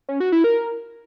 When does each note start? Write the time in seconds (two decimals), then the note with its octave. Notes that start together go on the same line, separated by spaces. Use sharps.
0.08 C#4
0.20 F#4
0.32 E4
0.44 A#4